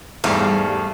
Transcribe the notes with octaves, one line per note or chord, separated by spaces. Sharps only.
E2 G#2 G3 A3 F5